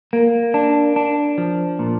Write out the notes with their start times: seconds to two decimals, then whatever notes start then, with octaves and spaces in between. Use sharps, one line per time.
0.13 A#3
0.54 D4
0.96 D4
1.38 F3
1.79 A#2